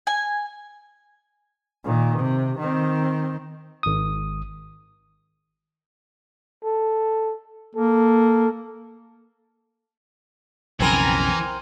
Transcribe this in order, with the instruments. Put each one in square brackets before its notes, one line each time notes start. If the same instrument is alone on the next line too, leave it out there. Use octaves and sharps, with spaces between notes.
[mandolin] G#5
[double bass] A#2 D#3
C3
D#3 C4
[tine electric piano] G#1 D#6
[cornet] A4
[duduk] A#3 [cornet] A4
[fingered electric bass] B1 F2 C#3 [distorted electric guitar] E3 [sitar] C4 A#4 [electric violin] G#5 A#5